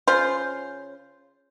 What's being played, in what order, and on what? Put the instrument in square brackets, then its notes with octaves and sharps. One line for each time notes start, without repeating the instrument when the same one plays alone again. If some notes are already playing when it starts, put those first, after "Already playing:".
[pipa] C#3 F4 C5